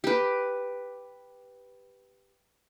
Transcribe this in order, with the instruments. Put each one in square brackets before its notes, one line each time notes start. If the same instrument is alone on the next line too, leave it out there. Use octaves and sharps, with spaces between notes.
[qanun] G4 B4